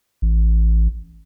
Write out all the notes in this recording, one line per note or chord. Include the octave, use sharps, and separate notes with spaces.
A1